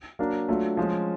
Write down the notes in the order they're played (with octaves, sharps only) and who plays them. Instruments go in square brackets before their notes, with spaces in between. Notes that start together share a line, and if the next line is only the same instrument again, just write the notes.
[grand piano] F#3 A#3 D4
F#3 A3 D4 F4
F3 G#3 C#4